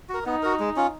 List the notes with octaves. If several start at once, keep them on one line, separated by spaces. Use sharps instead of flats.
F#4 A#4
B3 D#4
F#4 A#4
G#3
C#4 F4